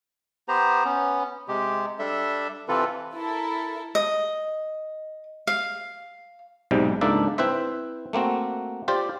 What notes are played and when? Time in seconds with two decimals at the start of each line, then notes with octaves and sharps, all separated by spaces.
0.48 B3 G4 C5 A#5
0.85 B3 C#4
1.48 C3 G#3 G4
1.99 G3 D4 A4 E5
2.68 C3 E3 C4 F4 A4 B4
3.14 E4 A4 A#4
3.95 D#5
5.47 F5
6.71 B1 G#2 C3 G3
7.01 C#2 G#2 A#3 D4 A4 E5
7.38 C4 E4 B4 C5 E5
8.13 A3 A#3 C4 F#4
8.88 F4 G4 C5 D5